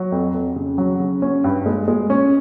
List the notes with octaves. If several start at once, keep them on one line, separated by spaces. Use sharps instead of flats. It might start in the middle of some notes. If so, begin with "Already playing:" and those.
Already playing: F#3
F2
F2
C#3
F#3
C#3
C#4
G2
G#3
G#3
C#4